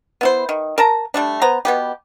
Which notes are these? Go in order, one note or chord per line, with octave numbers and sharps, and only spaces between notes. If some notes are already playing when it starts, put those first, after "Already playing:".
B3 E4 C5
D#3
A#4 A5 A#5
G3 A3 D4
B3 C5 A#5
B2 B3 G4